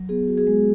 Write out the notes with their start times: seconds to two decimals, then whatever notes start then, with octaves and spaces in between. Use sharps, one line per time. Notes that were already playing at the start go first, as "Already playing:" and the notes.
Already playing: F#3
0.09 B3 G#4
0.28 F#4
0.37 G#4
0.47 G#3